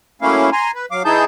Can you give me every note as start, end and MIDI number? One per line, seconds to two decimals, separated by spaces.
0.22 0.50 54
0.22 0.50 57
0.22 0.50 58
0.22 0.50 61
0.22 0.50 64
0.22 0.50 77
0.52 0.71 80
0.52 0.71 82
0.52 0.71 84
0.75 0.86 71
0.91 1.03 54
0.91 1.03 77
0.91 1.03 86
1.05 1.25 52
1.05 1.25 63
1.05 1.25 64
1.05 1.25 68
1.05 1.25 81
1.05 1.25 91